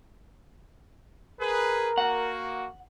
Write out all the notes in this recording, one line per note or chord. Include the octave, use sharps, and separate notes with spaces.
G#4 A#4 B4
A#3 F#4 F#5